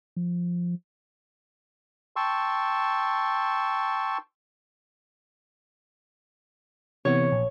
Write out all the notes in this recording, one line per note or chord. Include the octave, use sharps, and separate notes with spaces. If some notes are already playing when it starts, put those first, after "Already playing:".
F3
G5 A5 C6 C#6 E6
C3 E3 B3 C#5
A#1